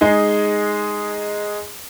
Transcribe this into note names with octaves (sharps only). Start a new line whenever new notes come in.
G#3 D#4 G#4